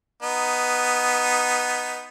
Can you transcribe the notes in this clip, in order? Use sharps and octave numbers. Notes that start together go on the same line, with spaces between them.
B3 D#4